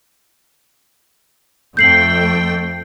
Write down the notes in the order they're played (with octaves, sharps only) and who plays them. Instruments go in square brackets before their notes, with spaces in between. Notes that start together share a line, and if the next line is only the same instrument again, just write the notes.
[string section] F2 A3 G5 [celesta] G6 C7 F#7